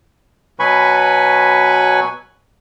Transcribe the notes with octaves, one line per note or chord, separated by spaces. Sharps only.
B2 F#3 B4 G#5 B5 C#6